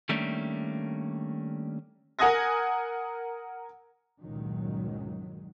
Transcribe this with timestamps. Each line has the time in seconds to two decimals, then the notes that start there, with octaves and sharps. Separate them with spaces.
0.09 D#3 G3 A3 A#3 C#4 D4
2.19 A#4 F#5 G#5 D#6 G#6 A#6
4.20 C#2 G2 A#2 D#3 F#3